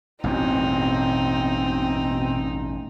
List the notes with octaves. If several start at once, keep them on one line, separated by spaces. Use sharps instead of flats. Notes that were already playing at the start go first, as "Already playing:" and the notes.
A1 E2 G2 B2 C4 D#4